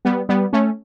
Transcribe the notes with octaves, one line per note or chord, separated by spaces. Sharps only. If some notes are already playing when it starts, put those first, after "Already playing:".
G3 B3
G3 B3
A3 C#4